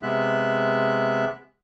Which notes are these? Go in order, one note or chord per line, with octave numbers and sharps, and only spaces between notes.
C3 G#3 B3 E5 F#6